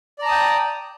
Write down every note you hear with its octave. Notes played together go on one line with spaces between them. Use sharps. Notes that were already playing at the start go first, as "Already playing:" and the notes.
D5 G5 A5 A#5 D#6